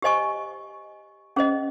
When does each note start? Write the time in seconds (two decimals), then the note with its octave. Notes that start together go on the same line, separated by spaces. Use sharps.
0.02 G4 C5 D#5 G#5 C#6
1.36 C#4 G#4 C5 D#5